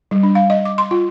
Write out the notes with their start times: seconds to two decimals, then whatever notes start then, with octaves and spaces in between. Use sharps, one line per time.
0.11 G3
0.23 D4
0.35 F5
0.50 D#5
0.65 D6
0.78 C6
0.91 F4